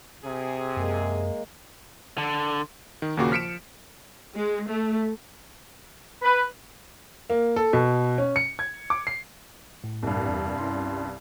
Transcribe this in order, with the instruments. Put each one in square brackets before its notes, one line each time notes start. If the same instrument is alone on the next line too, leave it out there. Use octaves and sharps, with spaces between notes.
[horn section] C3 G#4
[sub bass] F#2 [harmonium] G#3 A#3
[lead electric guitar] D3
[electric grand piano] D#3
D#2 A#2 C#3 A#3 F#4 D6
F3 F6 B6 C#7 D7 E7
[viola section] G#3
A3
[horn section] B4
[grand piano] A#3
A4
B2
C#4
C#7
G#6
D6
C7
[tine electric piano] A2
[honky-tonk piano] C2 G2
[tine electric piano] E2
C#4 E4 C6